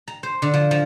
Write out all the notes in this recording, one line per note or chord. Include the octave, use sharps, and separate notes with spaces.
A#5
C5
D3
F3
F3